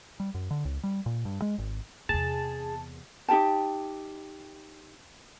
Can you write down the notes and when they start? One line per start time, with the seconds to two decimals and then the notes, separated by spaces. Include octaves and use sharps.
0.20 G3
0.34 F#2
0.51 D3
0.65 C#2
0.84 G3
1.06 A#2
1.25 G2
1.42 G#3
1.58 G#1
2.09 E2 C3 G#4 A5
3.28 D#4 G4 G5 A5